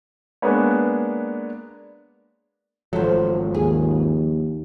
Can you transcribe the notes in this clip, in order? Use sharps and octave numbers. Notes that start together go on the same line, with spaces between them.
G#3 A#3 B3 D4 B4 C#5
G#1 F3 F#3 A3 C4
D#2 G#4